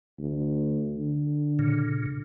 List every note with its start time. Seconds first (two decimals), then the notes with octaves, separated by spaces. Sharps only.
0.19 D2
0.97 D3
1.59 A#2 C#3